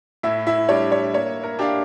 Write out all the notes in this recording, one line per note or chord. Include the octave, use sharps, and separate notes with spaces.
A2 E4 E5
E4 E5
G3 D4 G4 C#5
C#5
A#3 C#5
A#4
D4 G4 D5 F5